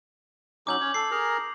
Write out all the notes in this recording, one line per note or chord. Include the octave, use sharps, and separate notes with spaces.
F#3 C#4 D#4 D6 G6 F#7
C#4 C#5
A4 C7
G#4 A#4 A#5